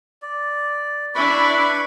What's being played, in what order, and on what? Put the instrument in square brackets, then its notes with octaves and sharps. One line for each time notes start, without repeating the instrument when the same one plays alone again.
[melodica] D5
[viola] D4 E4 [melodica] B4 B5 C#6